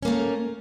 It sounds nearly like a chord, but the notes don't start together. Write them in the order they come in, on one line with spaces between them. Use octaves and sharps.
C#4 A#3 A3